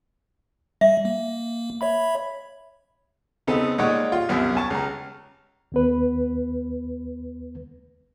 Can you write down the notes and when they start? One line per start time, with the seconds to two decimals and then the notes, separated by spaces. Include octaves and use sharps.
0.81 G3 E5
1.05 A#3
1.81 C#5 E5 B5
3.47 C#3 B3 C4 D#4 A4 B4
3.78 A#2 G#3 D#4 C#5 F#5 C#6
4.12 F4
4.29 C2 F#2 B3
4.55 G#5 A5 C#6
4.70 C#2 A#5
5.72 D#2 B3 B4